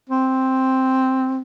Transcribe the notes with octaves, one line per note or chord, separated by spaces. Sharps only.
C4